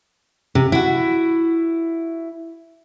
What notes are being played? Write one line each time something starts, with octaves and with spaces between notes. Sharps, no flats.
C3
E4 F#4